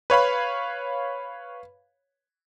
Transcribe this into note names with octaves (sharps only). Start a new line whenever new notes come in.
B4 C#5 F5 B5